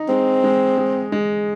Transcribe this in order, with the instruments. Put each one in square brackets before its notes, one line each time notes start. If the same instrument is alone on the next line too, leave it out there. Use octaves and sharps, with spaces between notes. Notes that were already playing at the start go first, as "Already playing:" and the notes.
Already playing: [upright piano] D#4
[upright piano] G#3 [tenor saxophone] C4
[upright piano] G#3
G#3
G#3